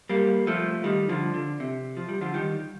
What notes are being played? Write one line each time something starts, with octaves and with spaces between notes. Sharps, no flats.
G3 A#3
F3 A3
D#3 G3
D3 F3
D3
C3
F3
G3
D3 F3
D#3 G3